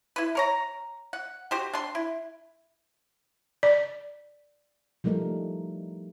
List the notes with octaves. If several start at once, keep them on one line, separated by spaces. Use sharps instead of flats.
E4 B4
A#4 C#5 A#5
F#5
F#4 G4 C5
D4 C6
E4
D5
F3 G3 A3 D#4 A#4